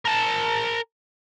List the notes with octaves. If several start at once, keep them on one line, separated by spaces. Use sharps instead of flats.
A#4 A5